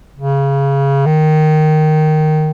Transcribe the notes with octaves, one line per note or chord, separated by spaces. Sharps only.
C#3
D#3